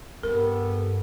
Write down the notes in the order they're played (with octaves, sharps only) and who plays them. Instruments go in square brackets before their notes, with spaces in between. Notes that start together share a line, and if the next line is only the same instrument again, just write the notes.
[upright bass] G2 [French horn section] B3 G4 A4 [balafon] A#4